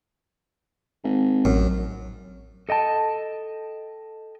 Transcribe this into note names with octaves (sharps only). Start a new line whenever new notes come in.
G#1
A1 F#2
A4 D#5 G5 A5